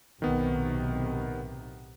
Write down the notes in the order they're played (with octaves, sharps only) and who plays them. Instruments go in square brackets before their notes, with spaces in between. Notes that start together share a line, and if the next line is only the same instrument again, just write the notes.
[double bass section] B1 A2 C3 [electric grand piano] D#3 B3